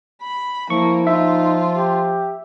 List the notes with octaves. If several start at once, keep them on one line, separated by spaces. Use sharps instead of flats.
B5
F3 A#3 E4 C#6
D#4 F4 E5
G4